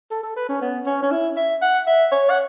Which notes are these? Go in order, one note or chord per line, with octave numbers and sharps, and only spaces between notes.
A4
A4
B4
C#4
B3
C#4
C#4
E4
E5
F#5
E5
C#5
F#5